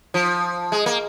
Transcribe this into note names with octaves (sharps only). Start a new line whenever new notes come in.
F3
G#3
A#3